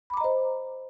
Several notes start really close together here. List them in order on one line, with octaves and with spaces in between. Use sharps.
B5 D6 A#5 D#5 C5